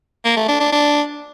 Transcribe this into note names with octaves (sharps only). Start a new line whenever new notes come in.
A#3
A3
D4
D4
D4